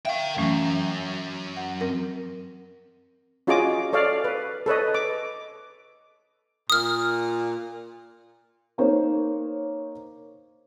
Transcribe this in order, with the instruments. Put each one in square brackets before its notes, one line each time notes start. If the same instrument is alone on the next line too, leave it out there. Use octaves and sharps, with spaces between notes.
[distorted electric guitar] A#4 G5 [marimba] E5 F5
[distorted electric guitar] F#2 [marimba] E3 A3 C#4
[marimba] F#5
C4 A#4
[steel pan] C#4 F4 F#4 G#4 D#5 D6
A4 C#5 D5 F5
B4
A4 B4 C#5 D#5
D6
[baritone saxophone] A#2 [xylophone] D#6 F6
[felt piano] A#3 D#4 C5 C#5